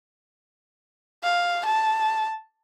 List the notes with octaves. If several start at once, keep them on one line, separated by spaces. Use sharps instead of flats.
F5
A5